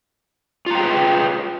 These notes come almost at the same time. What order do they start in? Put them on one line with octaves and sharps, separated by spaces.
F4 A#5 G5 G#4 B4